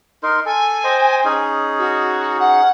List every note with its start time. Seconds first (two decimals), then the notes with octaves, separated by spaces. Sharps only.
0.23 D#4 A#4 C6
0.45 A4 G#5
0.84 C5 D#5 G5
1.25 C#4 D#4 G#4
1.79 F#4
2.39 F#5